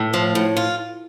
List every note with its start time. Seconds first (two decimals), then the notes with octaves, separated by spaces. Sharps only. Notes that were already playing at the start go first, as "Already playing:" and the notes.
Already playing: A2
0.14 F3
0.35 A2
0.57 F4